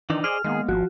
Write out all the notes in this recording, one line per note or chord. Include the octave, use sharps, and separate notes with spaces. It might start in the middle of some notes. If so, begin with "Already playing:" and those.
D#3 E3 D4 D#4
G#4 C5 D5 D#5 F6
D#3 G#3 A#3 B3 G#4
G#1 F3 F#4